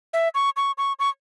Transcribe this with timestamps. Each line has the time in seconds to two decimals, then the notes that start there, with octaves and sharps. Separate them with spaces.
0.14 E5
0.35 C#6
0.57 C#6
0.78 C#6
0.99 C#6